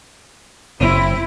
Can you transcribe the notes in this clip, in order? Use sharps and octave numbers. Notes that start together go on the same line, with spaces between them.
F#1 C4 E4